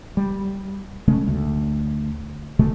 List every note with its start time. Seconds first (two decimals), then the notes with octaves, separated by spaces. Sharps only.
0.17 G3
1.08 C#3 G#3 A3 C#4
1.28 D2
2.59 B2 D3 G#3 A3